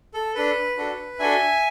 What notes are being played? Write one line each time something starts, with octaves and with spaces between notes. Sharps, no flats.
A4
D4 A4 B4
D4 F#4 A4
D4 F#4 A4 E5 G#5